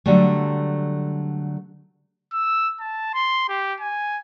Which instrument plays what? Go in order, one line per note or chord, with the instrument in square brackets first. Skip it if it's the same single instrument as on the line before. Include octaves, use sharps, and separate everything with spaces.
[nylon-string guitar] D3 F#3 G3 A3
[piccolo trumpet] E6
A5
C6
G4
G#5